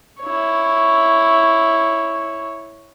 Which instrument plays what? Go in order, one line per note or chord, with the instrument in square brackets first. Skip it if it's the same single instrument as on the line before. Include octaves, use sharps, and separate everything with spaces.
[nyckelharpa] E4 C#5